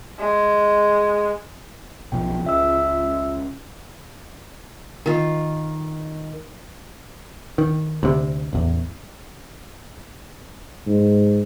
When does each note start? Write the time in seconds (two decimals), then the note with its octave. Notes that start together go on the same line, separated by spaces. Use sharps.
0.18 G#3
2.12 B1 B2 F3 G5
2.44 C#2 F4 E5 E6
5.06 D#3 F4
7.58 D#3
8.03 D2 C3
8.53 A1 E2
10.86 G#2